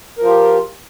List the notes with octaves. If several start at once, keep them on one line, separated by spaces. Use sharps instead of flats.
F3 F4 G4 A#4